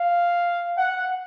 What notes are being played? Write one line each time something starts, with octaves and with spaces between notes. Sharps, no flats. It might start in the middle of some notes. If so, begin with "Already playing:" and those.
Already playing: F5
F#5